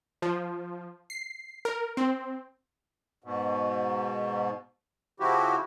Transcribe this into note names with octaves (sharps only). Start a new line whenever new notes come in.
F3
C7
A#4
C4
G#2 B2
C#3 F3 E4 F#4 G4